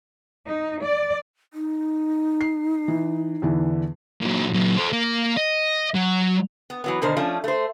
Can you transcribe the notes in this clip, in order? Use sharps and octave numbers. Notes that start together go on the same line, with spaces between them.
D#4
D5
D#4
C7
E3
E2 D3 E3
A#2 F#3
A#2 F#3
A4 C5
A#3
D#5
F#3
B3
E3 F#3 B3
B2 D3 D#3 A#4 C5
F3 A3 C#4 D4
A3 C5